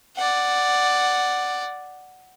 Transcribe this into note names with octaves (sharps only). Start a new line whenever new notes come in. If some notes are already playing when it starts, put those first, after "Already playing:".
D5 F#5